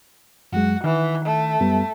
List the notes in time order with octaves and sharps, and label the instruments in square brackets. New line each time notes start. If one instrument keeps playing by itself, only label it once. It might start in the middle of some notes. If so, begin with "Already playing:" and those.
[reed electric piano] F#2 F#3 G#3 [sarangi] F#4
[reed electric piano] D#3 [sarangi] E3
[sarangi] A3
[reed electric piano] F#2 G3 B3